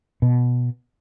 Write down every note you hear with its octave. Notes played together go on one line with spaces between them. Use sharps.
B2